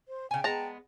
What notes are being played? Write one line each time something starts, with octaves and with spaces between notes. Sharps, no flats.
C5
C#3 G5 G#5
G#3 B3 A5 A#5